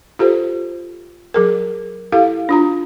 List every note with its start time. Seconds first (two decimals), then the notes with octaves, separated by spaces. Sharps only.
0.19 F4 G4 A4 C5
1.34 F#3 G#4 A#4
2.12 E4 G4 A4 F5
2.49 D4 F4 A#5